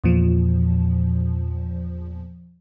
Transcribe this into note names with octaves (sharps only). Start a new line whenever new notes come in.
E2 A#2 F3